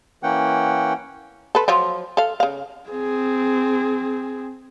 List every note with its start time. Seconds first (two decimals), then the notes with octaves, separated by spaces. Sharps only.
0.23 E3 A#3 C#4 F#5 G5
1.55 A4 B4
1.68 F3 F#3 F4
2.17 A4 F5
2.40 C#3 F5
2.90 C4 G#4